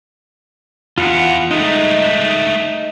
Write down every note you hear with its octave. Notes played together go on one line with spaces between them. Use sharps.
E2 F4 F#5
G#3 A3 D#4